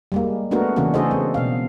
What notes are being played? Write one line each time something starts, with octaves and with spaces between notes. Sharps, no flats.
G3 G#3 A#3
A3 B3 D4 F#4 A#4
C#3 E3 A#3 C#4 F#4
D4 F#4 G#4 A4 C5 D#5
G#3 C4
B2 F5